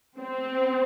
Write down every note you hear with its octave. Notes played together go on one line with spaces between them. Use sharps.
C4